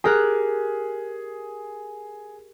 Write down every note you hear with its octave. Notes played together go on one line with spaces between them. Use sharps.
G4 G#4 A#4 F#6